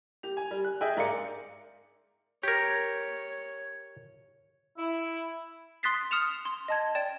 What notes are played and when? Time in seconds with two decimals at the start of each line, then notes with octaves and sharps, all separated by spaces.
0.23 G4 F7
0.37 G#5
0.51 G3
0.64 F#6
0.81 G#4 D#5 E5 G5
0.97 G#2 A#4 D5 F5 D6 C#7
2.43 G4 A#4 C#5
4.78 E4
5.83 C6 D#6 F#6 A6 B6 C7
6.11 D#6 F6 C#7 E7 F7
6.45 C6
6.68 D#5 A5 G#6
6.95 D5 G5 A6 E7